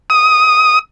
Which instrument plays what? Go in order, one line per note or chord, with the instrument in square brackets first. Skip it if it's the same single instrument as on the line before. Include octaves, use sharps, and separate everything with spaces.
[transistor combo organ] D#6